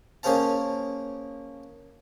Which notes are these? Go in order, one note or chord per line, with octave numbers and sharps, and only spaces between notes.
A#3 C#4 G#4 C5 F5 A5